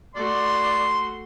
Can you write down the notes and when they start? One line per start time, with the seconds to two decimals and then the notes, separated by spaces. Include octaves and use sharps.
0.15 A3 F#4 D5 C6